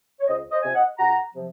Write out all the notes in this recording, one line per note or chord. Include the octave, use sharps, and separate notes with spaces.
C#5
C#2 C5 D#5
C5 D#5
C3 F3 G#5
D#5 F#5
C#2 F#5 A#5
C3 F3